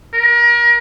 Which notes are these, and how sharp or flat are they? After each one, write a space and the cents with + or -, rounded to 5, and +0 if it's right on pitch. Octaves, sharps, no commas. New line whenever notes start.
A#4 +35